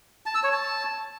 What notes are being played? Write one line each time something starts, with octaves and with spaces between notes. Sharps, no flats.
A5
E6
C#5
A5